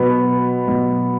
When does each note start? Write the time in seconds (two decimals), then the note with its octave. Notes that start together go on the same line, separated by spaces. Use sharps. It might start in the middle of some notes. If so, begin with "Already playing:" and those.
Already playing: B2 F#3 B3
0.67 B2 F#3